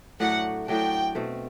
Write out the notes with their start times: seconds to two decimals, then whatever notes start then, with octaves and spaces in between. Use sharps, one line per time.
0.20 A2 F#3 A3 D4 F#5
0.68 A2 F#3 A3 D4 G5
1.15 B2 A3 C4